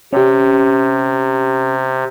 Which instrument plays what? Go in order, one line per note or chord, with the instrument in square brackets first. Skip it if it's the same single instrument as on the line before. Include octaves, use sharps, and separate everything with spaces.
[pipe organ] C3 [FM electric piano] C#4 G4